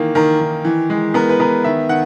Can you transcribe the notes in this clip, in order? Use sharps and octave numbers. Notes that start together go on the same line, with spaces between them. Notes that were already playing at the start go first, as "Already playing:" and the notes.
Already playing: D#3 E3 A#3
D#3 A#4
D#3
E3
G#3
B3 A#4
B4
B3 A#4
D#3 E5
D#3 F#5